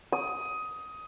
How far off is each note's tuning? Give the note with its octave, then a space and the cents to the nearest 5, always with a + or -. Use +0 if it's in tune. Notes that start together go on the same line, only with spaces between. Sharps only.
D#6 +15